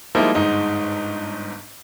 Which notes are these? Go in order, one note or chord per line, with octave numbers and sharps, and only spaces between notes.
F3 G3 G#3 A#3 D#4 E4
G1 G#2 D#4